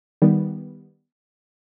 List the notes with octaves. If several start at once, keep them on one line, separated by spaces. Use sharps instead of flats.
D#3 G3 B3